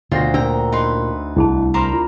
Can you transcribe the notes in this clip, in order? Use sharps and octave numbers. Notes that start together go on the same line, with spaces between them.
D2 B2 F4 C5 G5 A#6
A#2 D4 G5 A#5 E6
D#4 B4 C6
C2 E4 G#4 A5
A#4 C5 A#5 B5 D6 F6
F4